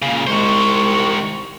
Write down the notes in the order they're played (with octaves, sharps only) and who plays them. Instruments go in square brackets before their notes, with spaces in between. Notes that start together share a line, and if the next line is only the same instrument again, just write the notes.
[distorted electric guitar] A#2 C#3
[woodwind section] C2 G#3 C#6 [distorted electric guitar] D#3 C5